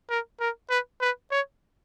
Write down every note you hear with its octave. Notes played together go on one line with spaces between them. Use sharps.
A#4
A#4
B4
B4
C#5